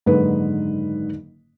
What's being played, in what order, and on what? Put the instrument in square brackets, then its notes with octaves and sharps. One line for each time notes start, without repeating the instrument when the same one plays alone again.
[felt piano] F#1 G#2 D3 D#3 D#4 B4